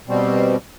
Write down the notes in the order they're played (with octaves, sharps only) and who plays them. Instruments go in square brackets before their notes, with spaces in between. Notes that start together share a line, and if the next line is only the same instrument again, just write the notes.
[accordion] B2 G3 C4